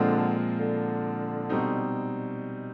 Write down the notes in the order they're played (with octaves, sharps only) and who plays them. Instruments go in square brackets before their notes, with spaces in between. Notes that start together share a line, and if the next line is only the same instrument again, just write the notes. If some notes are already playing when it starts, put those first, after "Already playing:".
Already playing: [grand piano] A#2 F3 G#3 C4 [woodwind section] D3
[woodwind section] D3
[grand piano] B2 G3 C4 D#4